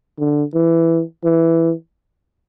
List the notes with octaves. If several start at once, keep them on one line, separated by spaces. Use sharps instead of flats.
D3
E3
E3